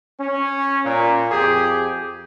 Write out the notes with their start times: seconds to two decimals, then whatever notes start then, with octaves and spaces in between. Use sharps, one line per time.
0.20 C#4
0.85 A#2
1.31 F2 G4 G#4